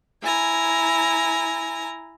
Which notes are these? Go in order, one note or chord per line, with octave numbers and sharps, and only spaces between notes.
E4 G#5 A#5